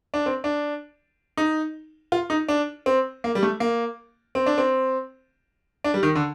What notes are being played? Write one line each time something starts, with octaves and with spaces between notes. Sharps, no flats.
D4
C4
D4
D#4
F4
D#4
D4
C4
A#3
G3
A3
A#3
C4
D4
C4
D4
G3
D#3
D3